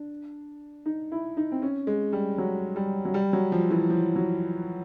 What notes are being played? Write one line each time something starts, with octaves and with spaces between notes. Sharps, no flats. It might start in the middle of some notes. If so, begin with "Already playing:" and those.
Already playing: D4
D#4
E4
D#4
C4
C#4
G#3
G3
F#3
G3
F#3
G3
F#3
F3
E3
F3
F#3